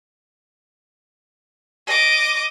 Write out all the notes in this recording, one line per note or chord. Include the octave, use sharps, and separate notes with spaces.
D#5 D6